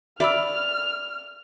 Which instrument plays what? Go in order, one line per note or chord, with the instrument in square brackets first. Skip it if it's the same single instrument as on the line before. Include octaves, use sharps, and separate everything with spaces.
[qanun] D5 [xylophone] E5 B5 E6 [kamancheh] F6